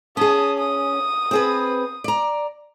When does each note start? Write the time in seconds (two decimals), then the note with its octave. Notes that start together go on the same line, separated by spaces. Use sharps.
0.17 C#4 G#4 A5 D#6
0.59 D#6
1.31 C4 G#4 B4
2.04 D5 A#5